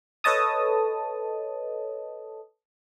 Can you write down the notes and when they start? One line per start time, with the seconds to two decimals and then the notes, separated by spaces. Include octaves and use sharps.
0.24 A4 B4 C#5 D#5 A5 D#6